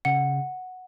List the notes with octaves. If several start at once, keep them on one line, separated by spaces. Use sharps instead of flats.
C#3 F#5